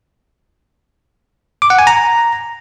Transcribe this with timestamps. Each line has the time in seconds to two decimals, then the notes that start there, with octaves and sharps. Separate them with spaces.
1.62 D6
1.70 F#5
1.79 G#5
1.87 A#5